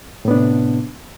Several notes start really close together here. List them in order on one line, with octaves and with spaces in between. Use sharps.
A2 B3 D4 C3